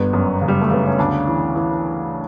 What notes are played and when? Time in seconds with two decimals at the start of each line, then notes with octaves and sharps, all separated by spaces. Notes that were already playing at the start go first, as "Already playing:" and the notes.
Already playing: G1 B3
0.13 F#2
0.41 C#3
0.48 G3
0.61 A3
0.70 C#3 B3
0.86 C#4
0.99 D2 D4
1.27 E3
1.55 E3